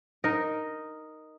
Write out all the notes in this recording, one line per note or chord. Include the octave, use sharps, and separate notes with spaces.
D#4 A#4 D#5